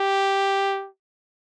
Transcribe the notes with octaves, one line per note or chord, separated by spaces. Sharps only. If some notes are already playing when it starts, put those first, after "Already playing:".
Already playing: G4